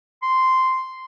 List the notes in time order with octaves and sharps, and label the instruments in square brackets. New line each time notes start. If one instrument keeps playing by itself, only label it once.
[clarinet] C6